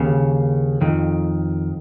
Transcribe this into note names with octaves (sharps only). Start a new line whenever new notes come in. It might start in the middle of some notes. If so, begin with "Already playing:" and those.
Already playing: D#2 C#3
F2 D#3